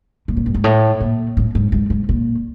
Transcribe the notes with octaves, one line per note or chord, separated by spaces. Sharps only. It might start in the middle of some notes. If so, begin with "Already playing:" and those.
A#2
F#2
G2
G#2
A2
A#2
A2
G#2
G#2
G#2
A#2